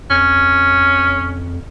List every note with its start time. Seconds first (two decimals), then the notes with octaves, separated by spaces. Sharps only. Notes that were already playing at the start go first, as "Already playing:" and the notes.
0.10 F2 C#4